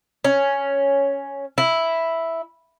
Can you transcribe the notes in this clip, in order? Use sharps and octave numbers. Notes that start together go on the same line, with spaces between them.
C#4
E4